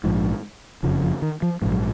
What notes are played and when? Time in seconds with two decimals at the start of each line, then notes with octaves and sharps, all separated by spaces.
0.04 A#1 G#2 F3
0.83 F#1 F2 C#3 F3
1.04 F3
1.22 D#3
1.42 F3
1.62 G#2 F3
1.66 A#1
1.71 F#3